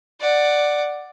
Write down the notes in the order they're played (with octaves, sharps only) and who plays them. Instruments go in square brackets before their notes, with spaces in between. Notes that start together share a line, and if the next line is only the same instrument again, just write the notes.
[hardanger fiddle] D5 F#5